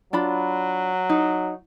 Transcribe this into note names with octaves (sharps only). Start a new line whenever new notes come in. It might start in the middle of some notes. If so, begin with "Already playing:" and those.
F#3 D4 F4 B5
D#4